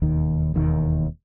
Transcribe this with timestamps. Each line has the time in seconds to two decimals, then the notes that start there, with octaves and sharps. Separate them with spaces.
0.02 E1 D#2 D#3
0.54 E1 D#2 D#3